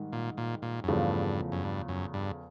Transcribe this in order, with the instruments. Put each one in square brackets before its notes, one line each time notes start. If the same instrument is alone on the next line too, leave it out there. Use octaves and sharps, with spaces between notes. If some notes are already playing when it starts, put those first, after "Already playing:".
Already playing: [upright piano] G#2 D#3 G3
[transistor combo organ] A#2
A#2
A#2
F#2
[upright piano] E2 C#3 F3 A3 [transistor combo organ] G2
[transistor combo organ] F#2
G2
F#2
G2